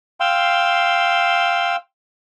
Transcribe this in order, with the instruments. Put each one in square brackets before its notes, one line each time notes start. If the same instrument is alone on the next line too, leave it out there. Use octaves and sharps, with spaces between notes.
[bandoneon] F5 G5 C6 E6